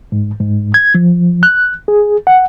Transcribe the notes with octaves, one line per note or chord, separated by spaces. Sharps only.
G#2
G#2
G#6
F3
F#6
G#4
F#5